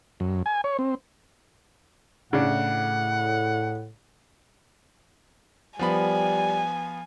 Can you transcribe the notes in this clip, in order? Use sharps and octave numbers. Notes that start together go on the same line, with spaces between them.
F#2
G#5
C#5
C4
A2 C#3 D4 F#5
F3 G3 B3 G#5 B5